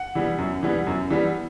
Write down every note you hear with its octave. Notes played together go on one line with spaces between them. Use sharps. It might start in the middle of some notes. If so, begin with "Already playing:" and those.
Already playing: F#5
E3 G3 B3
F#2
E3 G3 B3
F#2
E3 G3 B3